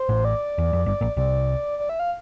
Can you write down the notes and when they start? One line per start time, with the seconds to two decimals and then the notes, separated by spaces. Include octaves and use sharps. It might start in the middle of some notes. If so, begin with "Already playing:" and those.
Already playing: C5
0.09 A1 A2
0.25 D5
0.58 E2
0.73 F2
0.86 G1 G2 D5
1.01 A#1 A#2
1.17 C2 C3 D5
1.79 D5
1.89 E5
2.00 F5